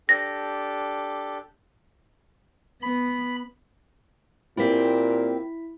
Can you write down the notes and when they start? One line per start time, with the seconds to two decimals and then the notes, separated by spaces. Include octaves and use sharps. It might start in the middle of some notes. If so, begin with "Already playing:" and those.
0.09 D4 G4 A4 A#6
2.82 B3 B5
4.57 A#2 A#3 C4 E4 G4 B6